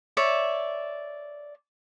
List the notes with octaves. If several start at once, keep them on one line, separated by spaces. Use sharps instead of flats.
C#5 D5 E5